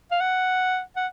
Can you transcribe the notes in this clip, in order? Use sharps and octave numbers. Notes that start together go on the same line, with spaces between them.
F5
F#5
F#5